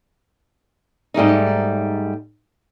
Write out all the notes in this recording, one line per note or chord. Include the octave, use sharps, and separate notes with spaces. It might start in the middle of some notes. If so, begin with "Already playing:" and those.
G#2 G3 A3 D#4